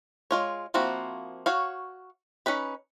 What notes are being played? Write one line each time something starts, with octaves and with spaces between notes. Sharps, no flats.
G#3 F4 C#5
F3 A#3 C4 E4 F#4
F#4 C#5 F5
C#4 D#4 B4 B5